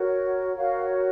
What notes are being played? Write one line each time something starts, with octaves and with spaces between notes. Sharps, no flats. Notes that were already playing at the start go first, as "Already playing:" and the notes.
Already playing: F#4 A#4 C#5
F#4 A#4 C#5 F5